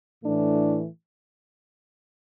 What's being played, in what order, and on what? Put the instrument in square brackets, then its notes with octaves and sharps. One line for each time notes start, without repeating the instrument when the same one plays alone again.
[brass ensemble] A2 E3 A3 D4